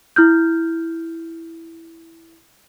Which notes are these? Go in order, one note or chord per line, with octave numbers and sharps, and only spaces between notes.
E4 F6 G6